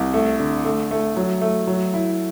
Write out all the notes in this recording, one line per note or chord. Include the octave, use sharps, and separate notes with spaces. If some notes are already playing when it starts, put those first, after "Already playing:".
Already playing: C2
A3
D3
A3
A3
F#3
A3
F#3
E4